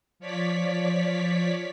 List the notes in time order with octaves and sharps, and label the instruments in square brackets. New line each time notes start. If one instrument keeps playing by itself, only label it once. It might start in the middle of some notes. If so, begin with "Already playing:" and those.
[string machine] F3 C#5 D5 B6